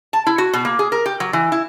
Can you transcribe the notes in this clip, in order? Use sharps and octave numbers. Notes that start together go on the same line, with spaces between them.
A5
E4
F#4
B2
A#3
G#4
A#4
G4
F#3
E3
E4